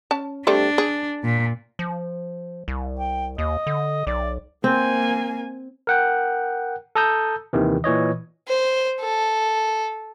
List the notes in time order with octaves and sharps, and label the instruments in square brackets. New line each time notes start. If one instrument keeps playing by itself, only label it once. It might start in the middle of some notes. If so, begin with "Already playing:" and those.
[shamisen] C#4 A5
[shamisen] G3 A3 C4 [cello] D4
[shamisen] G#4
[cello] A#2
[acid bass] F3
C2
[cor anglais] G5
[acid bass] D#2 [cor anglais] D#5
[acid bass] D3
[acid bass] B1 [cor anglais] D5
[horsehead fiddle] A#3 G#5 [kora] C4
[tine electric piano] A#4 F#5 G5
A4 A5 A#5 D#6 E6 G6
D#2 C3 D#3 E3
A#2 E3 C#5 D#5
[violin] C5
A4